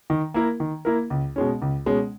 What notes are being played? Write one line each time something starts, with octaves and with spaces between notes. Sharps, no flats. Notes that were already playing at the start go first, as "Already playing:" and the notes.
D#3
A#3 E4 A#4
D#3
A#3 E4 A#4
C#2
B2 G#3 C#4
C#2
B2 G#3 C#4